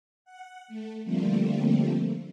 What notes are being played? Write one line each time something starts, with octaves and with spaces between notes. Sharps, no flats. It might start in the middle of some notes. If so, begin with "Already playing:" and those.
F#5
A3
D3 F3 G3 A3 A#3 C4